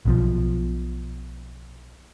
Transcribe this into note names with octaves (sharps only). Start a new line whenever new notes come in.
B1 B2 F3